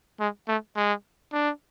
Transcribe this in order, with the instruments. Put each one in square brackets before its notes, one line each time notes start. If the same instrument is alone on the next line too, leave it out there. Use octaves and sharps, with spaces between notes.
[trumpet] G#3
A3
G#3
D4